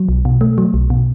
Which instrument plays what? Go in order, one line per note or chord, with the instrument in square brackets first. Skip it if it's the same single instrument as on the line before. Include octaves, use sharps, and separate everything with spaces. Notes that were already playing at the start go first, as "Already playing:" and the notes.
Already playing: [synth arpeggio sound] F#3
B1
B2
A3
F#3
B1
B2